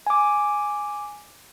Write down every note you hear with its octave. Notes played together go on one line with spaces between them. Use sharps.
G#5 D6